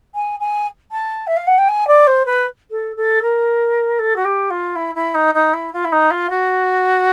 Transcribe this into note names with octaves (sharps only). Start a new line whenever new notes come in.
G#5
G#5
A5
E5
F5
F#5
G5
G#5
D5
C5
B4
A4
A4
A#4
A4
F#4
G4
F4
E4
E4
D#4
D#4
E4
F4
E4
D#4
F4
F#4